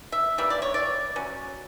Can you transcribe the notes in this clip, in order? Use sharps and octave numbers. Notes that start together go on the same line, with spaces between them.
E5
E3 G3 A#3 D4 E5
D5
C#5
D5
F#3 C#4